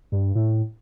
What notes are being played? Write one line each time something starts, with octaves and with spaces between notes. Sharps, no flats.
G2
A2